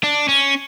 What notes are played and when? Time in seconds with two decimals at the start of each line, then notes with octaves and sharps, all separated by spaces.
0.03 D4
0.29 C#4